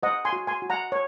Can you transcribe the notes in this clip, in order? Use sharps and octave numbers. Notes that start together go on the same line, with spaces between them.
C5 D#5 F#5
G#5 C6
F#4
G#5 C6
F#4
F#5 A#5
C#5